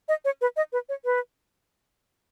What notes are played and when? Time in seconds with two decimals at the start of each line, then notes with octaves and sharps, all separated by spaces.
0.08 D#5
0.25 C#5
0.41 B4
0.57 D#5
0.73 B4
0.89 C#5
1.05 B4